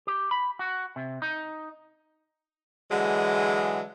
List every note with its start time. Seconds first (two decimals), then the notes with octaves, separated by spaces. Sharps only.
0.07 G4
0.31 B5
0.59 F#4
0.96 C3
1.22 D#4
2.91 D3 E3 F#3 G#3